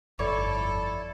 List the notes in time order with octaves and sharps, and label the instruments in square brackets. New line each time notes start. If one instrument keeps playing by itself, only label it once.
[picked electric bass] G1 F2 [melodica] E4 [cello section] A4 [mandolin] C#5 D5